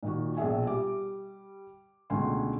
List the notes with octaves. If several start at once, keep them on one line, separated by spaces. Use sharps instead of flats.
A#2 D#3 F#4
A#1 B2 G#4 E5 G#5
G3 D6
C#2 B2 D3 A3 G#5 C6